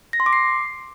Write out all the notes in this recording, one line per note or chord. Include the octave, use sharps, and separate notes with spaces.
A#6
C6
D6
C7